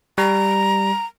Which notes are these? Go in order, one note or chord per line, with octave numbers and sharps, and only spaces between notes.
G3 A#5